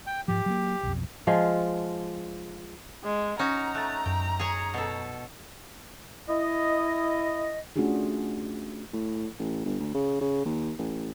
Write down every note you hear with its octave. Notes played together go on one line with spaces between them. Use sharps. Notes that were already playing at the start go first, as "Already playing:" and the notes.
G5
G#2 F3 G4
F#3 G#3 A#3
B1 F2
F3 G#3 F4
G#3
C#4 D#4 F#4 A#5
A3 F#6 A6
F#2 G5
G#4 C#5
B2 A4
E4 D#5
A3 C#4 D4 F4 F#4 G#4
A2
A1
G1
D2
C#3
C#3
D#2
A1